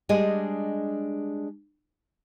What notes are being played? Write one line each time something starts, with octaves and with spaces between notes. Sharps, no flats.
G3 G#3 D4 G#4 D#5